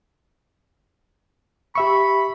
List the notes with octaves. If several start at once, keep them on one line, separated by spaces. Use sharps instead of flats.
G4 E5 B5 C#6